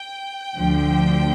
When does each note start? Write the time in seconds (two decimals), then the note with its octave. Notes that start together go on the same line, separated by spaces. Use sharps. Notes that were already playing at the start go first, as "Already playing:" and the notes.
Already playing: G5
0.57 D2 D3 F3